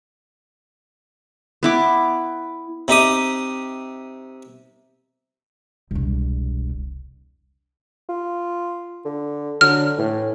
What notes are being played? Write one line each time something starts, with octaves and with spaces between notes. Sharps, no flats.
B3 E4 D6
C3 D#4 G4 D#6
E1 C2
F4
D3
D3 F#3 F6
A2 E3